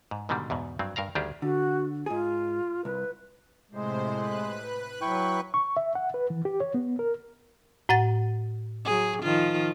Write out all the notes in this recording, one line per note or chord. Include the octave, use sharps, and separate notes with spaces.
G#2
G#2 B2 D3 D#3 G3
E2 G#2 B2
G2 F#3 C4
G2 A#4 F5 A#5
D2 D#3 G3 D4 G4 G#4
D3 F#4
G#2 F4 G#4
C2 B4
A2 C3 G#3 C5
B4 F#6
F#3 E4 G5 C#6
C#6
E5
F#5
B4
E3
G4
C#5
B3
A#4
A2 F#5 A6
F#3 G#4
D#3 F3 F4